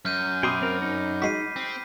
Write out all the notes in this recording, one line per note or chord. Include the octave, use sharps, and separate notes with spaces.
F#2 F6 G6 D#7
B2 G5 B5 C6 D6 D#6
C4 A#4
D#4
G#3 F#4 B6 C7 D#7
C4